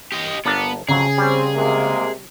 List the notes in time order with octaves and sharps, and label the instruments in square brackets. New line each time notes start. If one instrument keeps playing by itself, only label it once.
[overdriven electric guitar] G4 D#5
[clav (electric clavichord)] G1 D4 A#4 [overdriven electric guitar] B3
[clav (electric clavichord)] F2 F#3 A#5 [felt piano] C#3 [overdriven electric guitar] G#4
[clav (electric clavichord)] G3 C#4 [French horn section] C4
[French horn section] C3 G#3 A#3